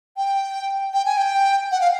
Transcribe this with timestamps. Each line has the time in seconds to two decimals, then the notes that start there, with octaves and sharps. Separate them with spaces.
0.17 G5
0.94 G5
1.06 G#5
1.17 G5
1.72 F#5
1.81 F5